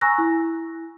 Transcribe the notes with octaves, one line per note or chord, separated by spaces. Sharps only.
G#5 A#5 C#6 E6 F#6 A#6
E4